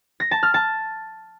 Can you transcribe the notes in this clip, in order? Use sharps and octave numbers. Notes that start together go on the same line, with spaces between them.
A#6
A5
F6
A5